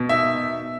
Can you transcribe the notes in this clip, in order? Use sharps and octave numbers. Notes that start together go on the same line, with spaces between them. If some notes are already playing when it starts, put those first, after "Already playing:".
Already playing: B2
D#4 E5